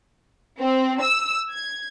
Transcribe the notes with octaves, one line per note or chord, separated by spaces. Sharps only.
C4
E6
G#6